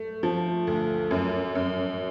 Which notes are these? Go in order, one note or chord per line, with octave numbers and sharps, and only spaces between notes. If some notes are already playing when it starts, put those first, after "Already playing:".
Already playing: A3
F3
D2
F#2
F#2